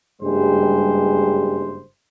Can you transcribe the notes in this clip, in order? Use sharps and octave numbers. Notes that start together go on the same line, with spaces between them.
F#1 G2 G3 G#3 C5